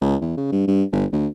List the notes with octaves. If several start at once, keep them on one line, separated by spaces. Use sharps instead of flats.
C#2
E2
C#3
G2
G2
G1
D2